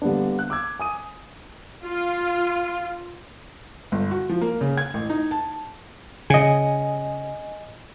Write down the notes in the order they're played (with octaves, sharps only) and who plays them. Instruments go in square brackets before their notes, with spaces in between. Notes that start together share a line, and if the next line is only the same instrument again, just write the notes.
[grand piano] D3 G3 A#3 B3 D4
F#6
D6 E6 G#6
G#5 D#6 D#7
[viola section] F4
[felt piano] G1
F#4
F3
A#3
C#3
G#6
A1
D#4
A5
[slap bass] C#3 [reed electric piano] D#5 G#5